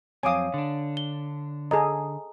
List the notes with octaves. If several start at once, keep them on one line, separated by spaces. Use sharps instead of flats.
F2 F#3 C4 C#5 F5 G#5 D6 D#6
D3 D4
G7
G#4 A4 D#5 A#5